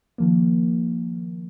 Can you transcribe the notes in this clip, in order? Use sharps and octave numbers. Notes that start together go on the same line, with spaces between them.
D#3 F3 A#3